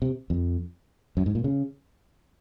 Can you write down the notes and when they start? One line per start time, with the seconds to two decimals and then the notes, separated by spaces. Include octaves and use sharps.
0.02 C3
0.30 F2
1.17 F#2
1.26 G#2
1.35 A#2
1.44 C#3